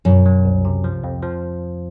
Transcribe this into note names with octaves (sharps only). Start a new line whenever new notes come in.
F#2 B2
F#3
C2
C3
F3
F2
F3